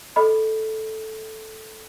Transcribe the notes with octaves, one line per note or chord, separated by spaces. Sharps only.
A4 D#5 B5